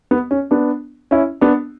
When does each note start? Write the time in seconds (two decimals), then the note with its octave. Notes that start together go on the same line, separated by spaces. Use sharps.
0.11 B3
0.31 C#4
0.51 B3 D4
1.11 C#4 E4
1.41 B3 D4